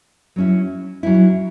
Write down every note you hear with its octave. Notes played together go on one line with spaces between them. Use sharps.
F#3 C#4 E4
F#3 C#4 E4